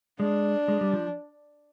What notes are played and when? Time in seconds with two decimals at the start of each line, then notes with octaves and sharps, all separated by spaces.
0.20 G#3 D4
0.68 G#3
0.81 G3
0.93 F3